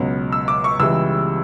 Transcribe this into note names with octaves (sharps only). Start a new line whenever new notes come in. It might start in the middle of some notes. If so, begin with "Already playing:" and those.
Already playing: C#2 B2 F#3
E6
D6
C#6
C#2 C#3 E3 G3 E6